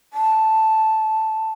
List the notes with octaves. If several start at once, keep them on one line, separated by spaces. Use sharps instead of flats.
A5